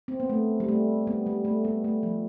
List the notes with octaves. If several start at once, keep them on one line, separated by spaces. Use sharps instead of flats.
C4
B3
A3
G3
A3
G3 B3
G3
A3
G3 B3
A3
F3